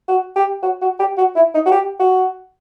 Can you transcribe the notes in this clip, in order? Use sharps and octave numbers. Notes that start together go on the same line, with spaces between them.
F#4
G4
F#4
F#4
G4
F#4
E4
D#4
F#4
G4
F#4